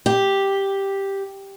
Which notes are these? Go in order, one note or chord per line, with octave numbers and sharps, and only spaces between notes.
G4